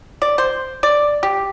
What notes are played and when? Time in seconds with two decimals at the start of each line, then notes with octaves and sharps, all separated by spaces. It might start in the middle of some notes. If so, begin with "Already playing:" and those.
0.22 D5
0.38 C5
0.83 D5
1.23 G4